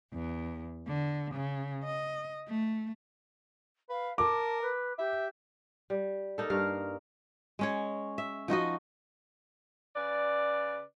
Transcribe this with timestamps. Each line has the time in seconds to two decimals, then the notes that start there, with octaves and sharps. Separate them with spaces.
0.13 E2
0.87 D3
1.34 C#3
1.84 D#5
2.48 A3
3.90 B4 F5
4.18 A#4 A5 D6
4.62 B4
4.98 G4 E5
5.90 G3
6.38 A#3 D#4 A4
6.50 G2 A#4 F5
7.59 G#3 C#4 C#5
8.18 E5
8.48 F3 D#4 F#4 D#5
9.95 C#3 B4 D5